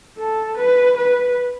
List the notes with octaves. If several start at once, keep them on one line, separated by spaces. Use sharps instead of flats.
A4
B4
B4